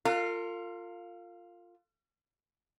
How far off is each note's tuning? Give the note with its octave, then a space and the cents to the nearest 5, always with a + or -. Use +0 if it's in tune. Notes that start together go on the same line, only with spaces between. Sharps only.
F4 +0 A#4 -45 F5 +0